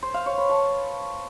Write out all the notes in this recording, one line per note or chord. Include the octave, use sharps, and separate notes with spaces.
C5
F5
C#5
B4
A5